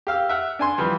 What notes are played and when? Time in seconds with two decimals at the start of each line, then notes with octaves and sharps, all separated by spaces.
0.07 G4 F5 E6
0.29 E5 F#5 F6
0.59 D4 G#5 C6
0.78 E3 F3 G3